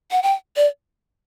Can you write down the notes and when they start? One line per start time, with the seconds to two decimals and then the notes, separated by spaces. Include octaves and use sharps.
0.11 F#5
0.23 G5
0.57 D5